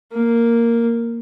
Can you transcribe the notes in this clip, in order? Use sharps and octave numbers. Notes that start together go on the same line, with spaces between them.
A#3